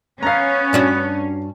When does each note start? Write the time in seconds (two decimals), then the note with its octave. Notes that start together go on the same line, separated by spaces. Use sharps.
0.23 B3 C#4 F5 A#5
0.73 G2 D4 F#4